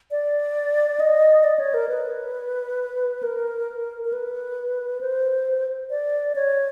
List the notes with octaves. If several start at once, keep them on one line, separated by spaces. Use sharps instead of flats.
D5
D#5
D5
C#5
A#4
B4
A#4
A#4
B4
C5
D5
C#5